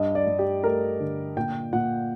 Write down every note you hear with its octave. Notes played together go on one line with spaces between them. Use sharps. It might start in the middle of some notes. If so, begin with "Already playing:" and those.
Already playing: G2 D#5
D5
G2
G4
A3 A#4
D3
A#2 G5
A#2 F#5